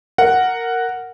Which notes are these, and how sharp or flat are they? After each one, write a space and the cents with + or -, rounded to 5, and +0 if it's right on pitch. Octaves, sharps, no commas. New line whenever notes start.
A#4 -10 F#5 +0